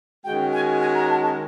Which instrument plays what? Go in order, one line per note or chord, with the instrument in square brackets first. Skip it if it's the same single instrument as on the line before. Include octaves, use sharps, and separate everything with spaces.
[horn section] D#3 G#3 C#4 F#4 [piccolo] G5
[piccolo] G#5
G#5
A#5
A5
A5